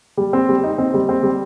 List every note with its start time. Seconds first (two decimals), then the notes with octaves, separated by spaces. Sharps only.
0.17 G3
0.33 C4
0.49 G3
0.64 D#4
0.78 C4
0.94 G3
1.09 C4
1.23 G3